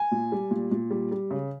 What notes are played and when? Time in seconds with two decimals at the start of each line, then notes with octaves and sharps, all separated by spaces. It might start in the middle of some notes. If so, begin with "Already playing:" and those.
Already playing: G#5
0.11 A#2
0.32 G3
0.51 A#2
0.71 A#2
0.91 G3
1.11 G3
1.31 C#3